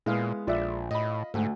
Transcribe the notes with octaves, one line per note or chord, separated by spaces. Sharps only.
A#2 G#3 B3 E4 F5 D#6
A#1 F4 D5 E5
A2 D#5 B5
F5
D2 G#2 A3 F#4